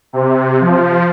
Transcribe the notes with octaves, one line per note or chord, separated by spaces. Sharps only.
C3
F3